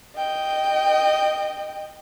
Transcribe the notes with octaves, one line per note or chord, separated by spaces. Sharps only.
D#5 G5